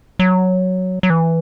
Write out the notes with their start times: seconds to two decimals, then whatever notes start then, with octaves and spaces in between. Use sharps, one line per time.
0.19 F#3
1.03 F#3
1.10 E3